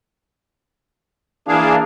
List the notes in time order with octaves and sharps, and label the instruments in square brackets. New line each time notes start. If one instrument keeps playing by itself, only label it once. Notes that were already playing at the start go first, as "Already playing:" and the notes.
[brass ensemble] E3 A#3 D4 [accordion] G#4 F5